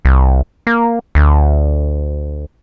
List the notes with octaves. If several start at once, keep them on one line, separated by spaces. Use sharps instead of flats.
C2
A#3
D2